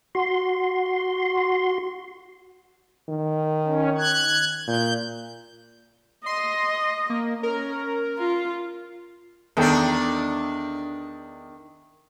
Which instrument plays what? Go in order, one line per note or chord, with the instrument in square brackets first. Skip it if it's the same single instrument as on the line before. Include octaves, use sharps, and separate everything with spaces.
[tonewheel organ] F#4 C6
[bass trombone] D#3
[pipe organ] C#4
F#6 G#6
[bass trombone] A#2 [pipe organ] G6
[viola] D#5 [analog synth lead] C6
[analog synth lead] A#3
[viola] C#4 [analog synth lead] A#4
[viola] F4
[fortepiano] E2 A4 G5 [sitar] D#3 D4